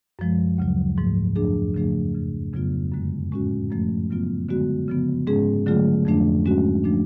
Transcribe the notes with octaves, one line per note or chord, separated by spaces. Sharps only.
F#2 F3 G#3
D2 C#3 F#3
G#2 F3 A3
F2 F3 A3 D4 G#4
C#3 F3 A3 D4 G#4
F2 C#3 F3
F2 C#3 F#3 B3 F4
F#2 D3 G#3
A2 G#3 C#4 F#4
F#2 F3 A3
C#3 F#3 B3 F4
D3 G#3 B3 F#4
C#3 F3 B3
G#2 G#3 C#4 G#4
D3 F#3 A3 F4 G#4
F2 F3 A3 D4
G#2 G#3 C#4 F#4
F3 A3 D4